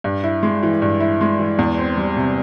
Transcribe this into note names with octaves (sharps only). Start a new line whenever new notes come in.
G2
E4
G#3
E3
G2
E4
G#3
E3
E2
C4
G3
C3